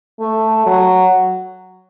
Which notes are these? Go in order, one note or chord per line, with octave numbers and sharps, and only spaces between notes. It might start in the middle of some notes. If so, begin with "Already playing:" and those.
A3
F#3